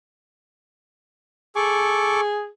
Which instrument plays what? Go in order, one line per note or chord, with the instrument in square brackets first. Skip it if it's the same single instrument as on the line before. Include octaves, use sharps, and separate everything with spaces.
[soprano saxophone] G#4 [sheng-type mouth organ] A4 C#6 D6